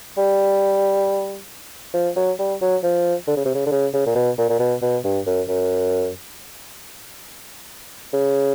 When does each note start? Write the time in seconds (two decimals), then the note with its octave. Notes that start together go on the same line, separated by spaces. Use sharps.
0.18 G3
1.94 F3
2.16 F#3
2.39 G3
2.61 F#3
2.83 F3
3.27 D3
3.36 C#3
3.45 C3
3.54 C#3
3.66 D3
3.71 C#3
3.94 C#3
4.06 A#2
4.15 B2
4.38 A#2
4.49 A#2
4.59 B2
4.82 B2
5.04 G2
5.26 F#2
5.48 F#2
8.14 C#3